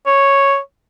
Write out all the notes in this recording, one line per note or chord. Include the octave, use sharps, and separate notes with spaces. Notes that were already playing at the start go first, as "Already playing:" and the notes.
C#5